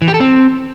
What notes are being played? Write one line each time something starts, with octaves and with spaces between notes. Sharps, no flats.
E3
G4
A4
C4